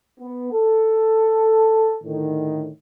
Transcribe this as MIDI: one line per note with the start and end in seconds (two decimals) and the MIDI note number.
0.20 0.51 59
0.53 1.96 69
2.04 2.69 45
2.04 2.69 50
2.04 2.69 51